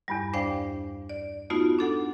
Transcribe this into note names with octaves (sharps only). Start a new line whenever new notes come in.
E2 G2 G3
D4 C5 D5 F5 G5
D5
A3 B3 D#4 F4 F#4
D4 A4 F#5